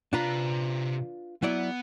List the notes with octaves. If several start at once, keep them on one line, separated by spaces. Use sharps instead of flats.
C3 D4 F4 B4 A#5
F#3 B3 E4 D5